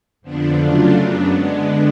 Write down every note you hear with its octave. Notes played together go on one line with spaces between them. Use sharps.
F2 D3 F3 B3 D4
C#3 F#3 A3 D4 F4
F#2 C#3 F#3 B3 D4
D3 G#3 B3 D4